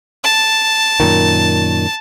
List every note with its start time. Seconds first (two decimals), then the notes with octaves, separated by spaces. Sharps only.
0.24 A5
1.00 F#2 A#2 D#3